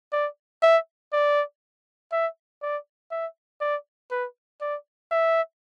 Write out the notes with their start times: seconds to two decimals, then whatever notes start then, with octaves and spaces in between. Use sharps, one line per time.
0.12 D5
0.62 E5
1.13 D5
2.12 E5
2.62 D5
3.11 E5
3.61 D5
4.11 B4
4.61 D5
5.11 E5